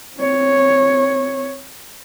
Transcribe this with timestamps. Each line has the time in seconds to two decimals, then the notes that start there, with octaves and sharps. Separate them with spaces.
0.17 C4 C#5